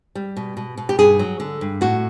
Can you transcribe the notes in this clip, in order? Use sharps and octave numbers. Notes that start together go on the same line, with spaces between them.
G3
B2
B2
B2
G4
G2 G#4
F#3
D3
G2
A2 F#4